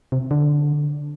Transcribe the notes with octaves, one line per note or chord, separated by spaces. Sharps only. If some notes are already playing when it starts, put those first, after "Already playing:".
C3
D3